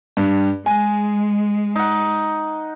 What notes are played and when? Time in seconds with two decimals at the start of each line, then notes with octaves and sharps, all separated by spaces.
0.17 G2
0.66 G#3 G#5
1.75 D#4 F#5